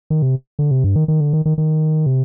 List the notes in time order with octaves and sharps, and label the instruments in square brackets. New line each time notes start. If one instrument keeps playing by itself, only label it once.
[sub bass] D#3
C3
D3
C3
G2
D#3
D#3
D3
D#3
D#3
D#3
C3